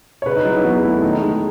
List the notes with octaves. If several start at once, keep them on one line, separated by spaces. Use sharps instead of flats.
C#5
C#3 B4
D#4
F#3 E4
E4
E2 F#4
A3 E4
D#3 D#4
G#3